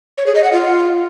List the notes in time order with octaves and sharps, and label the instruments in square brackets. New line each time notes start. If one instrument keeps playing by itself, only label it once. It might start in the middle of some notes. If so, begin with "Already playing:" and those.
[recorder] C#5
G#4
D#5
F#5
F4